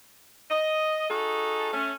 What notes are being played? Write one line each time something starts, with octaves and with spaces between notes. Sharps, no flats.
D#5
D#4 F#4 G#4 A4
A3 C#4